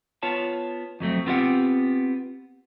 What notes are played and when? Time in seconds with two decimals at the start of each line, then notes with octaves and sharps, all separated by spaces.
0.23 B3 F4 C#5 A5
1.00 F2 F#3 A3 C4
1.26 B3 C4 F4 G4 E5 F#5